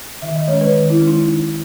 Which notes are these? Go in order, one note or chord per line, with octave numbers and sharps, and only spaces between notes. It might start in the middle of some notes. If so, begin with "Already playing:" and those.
D#3 E5
D#5
G#3 C#4 C#5
B4
D#3
E4
G#3 C#4
D#4
D#3